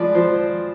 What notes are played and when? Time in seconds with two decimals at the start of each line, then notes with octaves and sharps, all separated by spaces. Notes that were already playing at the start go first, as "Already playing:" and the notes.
Already playing: F3 G#3 B4 D5
0.15 F3 C5